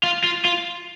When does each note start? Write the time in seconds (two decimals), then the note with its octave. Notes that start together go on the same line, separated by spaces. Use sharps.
0.03 F4
0.24 F4
0.45 F4